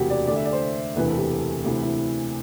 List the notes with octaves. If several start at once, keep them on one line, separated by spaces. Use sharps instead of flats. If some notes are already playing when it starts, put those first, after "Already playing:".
Already playing: E1 D2 C3 F#4 G4
D5
D2 D3 D5
E5
D5
C5
E1 D2 C3 E3 B4
A4
G4
D2 C3 E3
E4